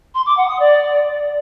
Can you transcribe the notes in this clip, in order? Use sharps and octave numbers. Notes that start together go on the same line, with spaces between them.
C6
D6
F#5
D#6
D5